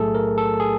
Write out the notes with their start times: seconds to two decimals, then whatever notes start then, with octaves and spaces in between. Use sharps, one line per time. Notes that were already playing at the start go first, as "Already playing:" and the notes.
Already playing: B1 A2 F#3 A3 G#4 A4
0.15 A#4
0.38 A4
0.60 G#4